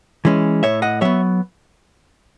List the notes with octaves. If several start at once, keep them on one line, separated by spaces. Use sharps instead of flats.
E3 G#3 C#4
A2 C#5 E5
D#5 F#5
F#3 B3 C#5 E5